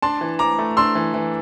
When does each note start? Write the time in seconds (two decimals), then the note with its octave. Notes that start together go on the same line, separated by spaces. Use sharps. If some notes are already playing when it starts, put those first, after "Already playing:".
0.02 D4 A5 C6
0.21 E3
0.39 E3 A#5 D6
0.59 A3
0.77 D4 C6 E6
0.95 E3
1.14 E3